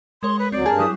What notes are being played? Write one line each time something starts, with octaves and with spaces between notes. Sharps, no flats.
G#3 A#4 C#5 C6
B4
D2 F#3 C4 D5
G2 G#4 A#4 A5
F#3 G3 E4 D#6